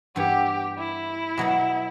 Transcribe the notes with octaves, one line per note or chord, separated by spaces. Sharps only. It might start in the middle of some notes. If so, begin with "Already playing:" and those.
G2 E3 B3 G4
E4
B2 F#3 B3